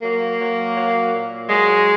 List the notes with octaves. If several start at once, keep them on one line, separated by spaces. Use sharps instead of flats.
F#3 A#3
F#3
F#3
A#2
F#3 G#3